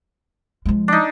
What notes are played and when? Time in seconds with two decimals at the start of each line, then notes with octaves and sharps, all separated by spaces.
0.65 F3 G#3
0.88 D4 D#4